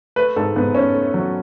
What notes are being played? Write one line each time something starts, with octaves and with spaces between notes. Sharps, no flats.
A3 B4
G#2 A4
G#2 B3
G#2 C#4
A3
F#3